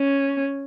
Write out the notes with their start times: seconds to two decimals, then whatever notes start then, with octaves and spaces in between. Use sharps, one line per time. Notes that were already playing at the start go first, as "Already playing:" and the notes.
Already playing: C#4